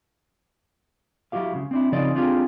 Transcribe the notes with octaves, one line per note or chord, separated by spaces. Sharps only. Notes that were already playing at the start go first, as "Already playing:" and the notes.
F#3 E4 F#4 G4 F5
C#2 C#3
C4 D4 E4
C#3 F3 C4 C#4 D#4 D5
C4 D4 F4 G4 G#4